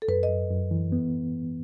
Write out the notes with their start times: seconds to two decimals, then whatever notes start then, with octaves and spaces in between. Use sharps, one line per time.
0.02 A4
0.08 F#2 B4
0.23 D#5
0.29 F#2
0.50 F#2
0.71 E3
0.92 B3